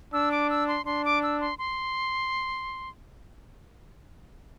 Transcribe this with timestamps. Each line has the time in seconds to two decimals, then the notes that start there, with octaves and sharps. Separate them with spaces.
0.13 D4 E6
0.31 D6
0.50 E6
0.68 C6
0.86 D4 C6
1.05 D6
1.23 E6
1.41 C6
1.59 C6